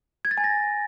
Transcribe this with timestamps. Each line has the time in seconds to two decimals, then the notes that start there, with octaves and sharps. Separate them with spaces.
0.25 G#6
0.31 A6
0.38 G#5
0.44 A#6